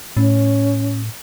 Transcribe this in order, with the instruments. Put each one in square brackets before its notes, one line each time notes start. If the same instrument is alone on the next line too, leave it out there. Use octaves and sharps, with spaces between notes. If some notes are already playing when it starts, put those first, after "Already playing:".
[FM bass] A2 [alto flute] C#4